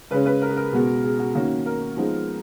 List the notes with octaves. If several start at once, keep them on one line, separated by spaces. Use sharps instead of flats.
C#3 G#3 C#4 B4
B4
A#4
G#4
A#4
B2 G#3 B3
G#4
F#4
D#3 A#3 C#4 F#4
A#4
F3 G#3 B3 D#4